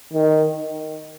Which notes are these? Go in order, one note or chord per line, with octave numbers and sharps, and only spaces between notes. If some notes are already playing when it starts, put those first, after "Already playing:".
D#3